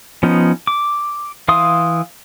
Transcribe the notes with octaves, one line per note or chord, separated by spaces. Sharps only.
F3 B3 C#4 D#4
D6
E3 F5 C6 D#6